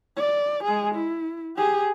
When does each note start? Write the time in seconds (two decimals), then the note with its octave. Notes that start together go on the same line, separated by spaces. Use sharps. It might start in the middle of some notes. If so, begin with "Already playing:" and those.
0.17 D5
0.64 G#3 G#4
0.95 E4
1.57 G4 G#4